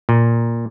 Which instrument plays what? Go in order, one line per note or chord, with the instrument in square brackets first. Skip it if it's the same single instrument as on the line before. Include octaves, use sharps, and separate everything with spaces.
[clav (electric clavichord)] A#2